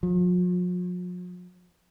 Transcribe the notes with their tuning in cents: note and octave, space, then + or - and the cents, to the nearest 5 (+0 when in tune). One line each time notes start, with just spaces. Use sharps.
F3 +45